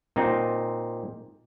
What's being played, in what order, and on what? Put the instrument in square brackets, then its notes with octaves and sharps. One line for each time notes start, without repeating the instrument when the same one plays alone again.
[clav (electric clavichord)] A#2 C4 D#4